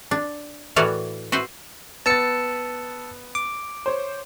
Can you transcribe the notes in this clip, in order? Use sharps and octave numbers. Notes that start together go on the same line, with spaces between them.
D4
A2 E3 F#4 A#4 C#5 D5
F#4 B4 C5 E5
B3 A5 E6 A6 C#7
D6
C5 C#5